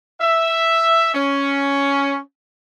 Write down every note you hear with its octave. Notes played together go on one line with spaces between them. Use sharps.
E5
C#4